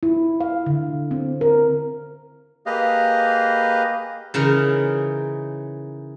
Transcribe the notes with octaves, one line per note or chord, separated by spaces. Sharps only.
E4
F5
D3
C4
A#4
A#3 G4 G#4 B4 D#5 F5
C#3 E3 D#4 A#4